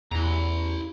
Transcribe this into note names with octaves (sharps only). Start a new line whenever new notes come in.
E2 E4 A#5